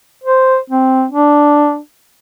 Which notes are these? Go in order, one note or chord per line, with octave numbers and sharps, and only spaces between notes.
C5
C4
D4